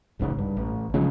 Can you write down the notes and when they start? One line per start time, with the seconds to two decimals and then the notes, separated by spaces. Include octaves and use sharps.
0.19 D1 A1 G#2 C#3
0.38 G2
0.57 A1
0.94 C#3 F3 F#3 G#3